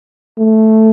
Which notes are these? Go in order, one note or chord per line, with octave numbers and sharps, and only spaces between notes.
A3